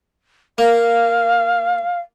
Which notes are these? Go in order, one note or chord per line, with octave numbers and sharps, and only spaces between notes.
A#3 F5